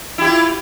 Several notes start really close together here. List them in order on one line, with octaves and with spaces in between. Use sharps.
E4 G4 F4